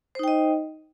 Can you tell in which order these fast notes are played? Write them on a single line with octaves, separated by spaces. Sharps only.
C5 D#4 G5 D#5